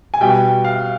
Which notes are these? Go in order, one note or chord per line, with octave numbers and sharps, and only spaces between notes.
G#5
B2 G3 G5
F5